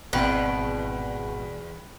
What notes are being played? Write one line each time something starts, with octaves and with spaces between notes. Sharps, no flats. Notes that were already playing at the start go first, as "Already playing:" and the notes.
G#1 E2 B2 C4 G5 B5 F#6